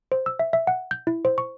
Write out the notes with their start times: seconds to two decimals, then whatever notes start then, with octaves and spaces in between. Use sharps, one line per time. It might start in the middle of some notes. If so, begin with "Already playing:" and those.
0.12 C5
0.26 E6
0.39 E5
0.53 E5
0.67 F#5
0.91 G6
1.07 E4
1.25 C5
1.38 C#6